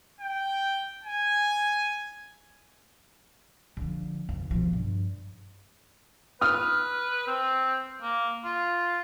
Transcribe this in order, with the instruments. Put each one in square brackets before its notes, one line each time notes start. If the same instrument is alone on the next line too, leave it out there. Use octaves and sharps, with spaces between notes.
[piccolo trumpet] G5
G#5
[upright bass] D3 F3
F1
B2 F3
G2
[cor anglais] B4 [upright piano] D#6 F6
[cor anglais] C4
A#3
F4